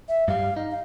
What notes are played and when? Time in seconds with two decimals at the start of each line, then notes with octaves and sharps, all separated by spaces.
0.09 E5
0.28 G2 G3 F5
0.57 D#4
0.71 F5